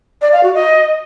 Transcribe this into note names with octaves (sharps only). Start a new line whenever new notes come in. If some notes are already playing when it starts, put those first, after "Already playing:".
D5
F5
F#4
D#5